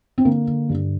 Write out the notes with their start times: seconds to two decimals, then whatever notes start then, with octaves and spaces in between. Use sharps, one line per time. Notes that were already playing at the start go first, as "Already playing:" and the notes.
0.18 C4
0.25 D3 A#3
0.48 D3
0.69 G2